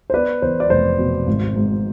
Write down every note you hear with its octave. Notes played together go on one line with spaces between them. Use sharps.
C5
B3 B4 D5
E2 C5
D5
F1 C5
B2
G#1
G#2